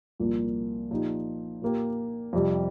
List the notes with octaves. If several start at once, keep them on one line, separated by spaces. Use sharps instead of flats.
C2 A#2 F3 A#3
A#2 F3 D#4 G4
A#2 A#3 G4
F2 C3 G3